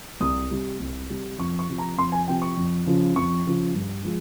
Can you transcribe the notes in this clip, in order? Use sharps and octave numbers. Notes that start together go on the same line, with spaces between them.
C2 D#6
C3 G3
C2
C3 G3
F2 C#6
C#6
C3 F3
A#5
F2 C6
G#5
C3 F3 G5
C#6
F2
C#3 F3
F2 C#6
C#3 F3
G2
F3 G#3